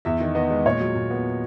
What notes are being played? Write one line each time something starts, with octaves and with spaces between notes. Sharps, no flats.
E2 E5
D#3
B3 D#5
G#3
A#2 C#5
F#3
A#2
B3